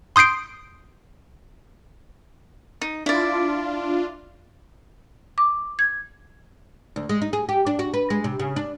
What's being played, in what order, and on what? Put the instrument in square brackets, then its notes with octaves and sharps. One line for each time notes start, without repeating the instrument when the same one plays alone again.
[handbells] C6 D#6 G6 C7 D7
[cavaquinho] D#4
[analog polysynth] D4 F4 [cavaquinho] E4 D5
[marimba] D6
G#6
[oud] D2
G#3
D#4
G#4
G4
D4
F#4
B4
G#3
C3
C#3
D4